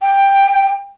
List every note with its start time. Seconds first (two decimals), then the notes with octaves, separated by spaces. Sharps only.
0.02 G5